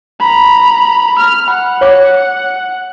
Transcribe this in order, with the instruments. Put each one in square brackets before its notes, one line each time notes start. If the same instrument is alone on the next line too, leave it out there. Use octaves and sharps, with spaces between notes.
[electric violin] A#5 B5
F6
[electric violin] F#5 [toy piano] B5
[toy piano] C#5 F5 D6